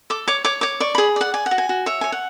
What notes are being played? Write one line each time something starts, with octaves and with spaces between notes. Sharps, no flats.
A4 D6
C#5 D6
C#5 D6
C#5 D6
D5 C#6
G#4 B5
D5 F#5
D5 G#5
F#5
F#4
G#5
F#4
C#5 E5
C#5 G#5
F#5